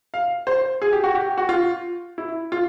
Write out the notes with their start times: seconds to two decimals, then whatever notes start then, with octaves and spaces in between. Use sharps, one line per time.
0.14 F5
0.47 C5
0.82 G#4
0.93 G4
1.04 F#4
1.15 G4
1.38 F#4
1.49 F4
2.18 E4
2.52 F4